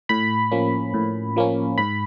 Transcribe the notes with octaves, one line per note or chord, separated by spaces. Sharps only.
A2 B5
F3 A#3 C#4
A2
F3 A#3 C#4
G#2 B5